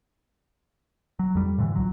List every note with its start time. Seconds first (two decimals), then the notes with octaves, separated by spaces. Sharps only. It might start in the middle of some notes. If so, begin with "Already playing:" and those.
1.19 F#3
1.35 F2 G3
1.58 A2 D3 E3
1.76 C#2 F#3